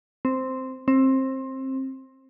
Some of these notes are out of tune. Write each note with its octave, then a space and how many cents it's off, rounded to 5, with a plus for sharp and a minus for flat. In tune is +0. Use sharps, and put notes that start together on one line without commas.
C4 -5
C4 +20